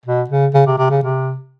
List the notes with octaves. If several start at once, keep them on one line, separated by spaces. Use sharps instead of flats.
B2
C#3
C#3
C3
C3
C#3
C3